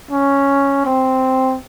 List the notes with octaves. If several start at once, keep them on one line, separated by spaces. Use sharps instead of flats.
C#4
C4